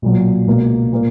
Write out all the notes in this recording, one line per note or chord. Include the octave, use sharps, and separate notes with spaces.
B1 A#2 F#3
C#2 B2 A#3
A#2 A#3